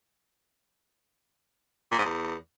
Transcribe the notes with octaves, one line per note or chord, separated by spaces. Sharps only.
A#2
G#2
E2